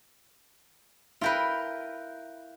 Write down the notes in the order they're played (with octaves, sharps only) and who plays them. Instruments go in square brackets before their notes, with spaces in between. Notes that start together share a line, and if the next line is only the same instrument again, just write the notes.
[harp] E4 G5 [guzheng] F4 A#4 B4